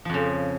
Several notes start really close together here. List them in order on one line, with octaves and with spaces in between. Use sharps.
F3 F2 C#3